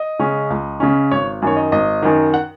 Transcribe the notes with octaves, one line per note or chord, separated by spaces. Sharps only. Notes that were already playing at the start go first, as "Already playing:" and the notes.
Already playing: D#5
C#3 G#3 C#4
C#2
C#3 G#3 C#4
G#1 C#5
F#2 D#3 C#5
D#5
G#1 D#5
F#2 D#3
F#5